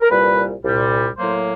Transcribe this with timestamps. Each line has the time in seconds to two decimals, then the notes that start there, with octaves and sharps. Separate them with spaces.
0.01 A#4
0.10 C2 A#2 G3 B4
0.64 C2 A#2 G3
1.17 A2 F#3 A#3 C5